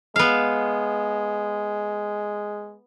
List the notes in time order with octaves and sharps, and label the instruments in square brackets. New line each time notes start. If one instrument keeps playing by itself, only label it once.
[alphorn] G#3 [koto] B3 F5